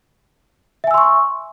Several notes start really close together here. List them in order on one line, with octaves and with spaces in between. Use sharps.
E5 G#5 E6 C6 C#6